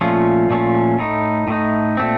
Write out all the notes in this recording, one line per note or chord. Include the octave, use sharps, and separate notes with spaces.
A#2 F3 A3 C#4 F4
A#2 F3 A3 C#4 F4
A2 A3 D#4
A2 A3 D#4
A#2 A3 C4